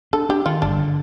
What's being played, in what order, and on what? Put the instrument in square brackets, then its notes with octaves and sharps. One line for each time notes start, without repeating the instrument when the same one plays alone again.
[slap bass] D4 [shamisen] A4
[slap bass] D4 [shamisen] G4
[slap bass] D#3 [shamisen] F4
[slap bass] G1 [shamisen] D4
[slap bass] D3